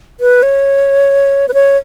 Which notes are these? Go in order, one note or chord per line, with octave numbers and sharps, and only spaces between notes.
B4
C#5
B4
C#5